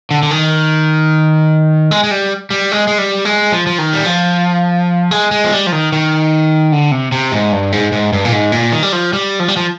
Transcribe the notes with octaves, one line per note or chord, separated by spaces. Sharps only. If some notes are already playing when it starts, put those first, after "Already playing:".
D3
D3
D#3
G#3
G#3
G3
G3
G#3
G#3
G3
G#3
F3
F3
D#3
G3
F3
G#3
G#3
F3
G3
F3
D#3
D#3
D3
C3
C3
G#2
G2
G#2
G#2
G2
A#2
G#2
A#2
D#3
G3
F3
G3
F3
G3
F3